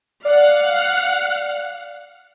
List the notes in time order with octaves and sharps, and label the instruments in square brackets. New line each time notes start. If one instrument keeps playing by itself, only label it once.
[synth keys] D5 [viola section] F5 F#5